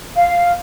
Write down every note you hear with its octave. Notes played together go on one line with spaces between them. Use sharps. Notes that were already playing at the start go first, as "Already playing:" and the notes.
F5